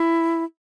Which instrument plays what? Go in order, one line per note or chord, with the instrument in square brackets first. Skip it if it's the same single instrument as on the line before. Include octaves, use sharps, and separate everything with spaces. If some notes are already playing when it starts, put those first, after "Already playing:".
Already playing: [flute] E4